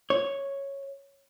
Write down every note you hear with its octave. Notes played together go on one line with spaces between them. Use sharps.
C#5